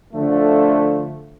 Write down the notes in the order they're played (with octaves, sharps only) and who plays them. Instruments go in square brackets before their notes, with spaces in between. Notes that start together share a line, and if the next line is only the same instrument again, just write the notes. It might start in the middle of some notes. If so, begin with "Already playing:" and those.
[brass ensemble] D3 F3 A3